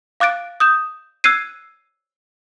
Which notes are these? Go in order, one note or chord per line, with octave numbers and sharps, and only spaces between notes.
F5 D6 F#6 A6 D7
D#6 G6 E7
E6 F#6 G#6 C7 D#7